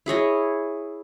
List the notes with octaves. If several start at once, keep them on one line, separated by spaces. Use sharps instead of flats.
E4 G#4 C#5 D#5